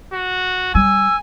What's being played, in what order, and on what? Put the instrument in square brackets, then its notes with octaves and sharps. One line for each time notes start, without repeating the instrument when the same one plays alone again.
[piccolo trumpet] F#4
[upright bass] G3 [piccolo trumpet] G#5 [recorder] E6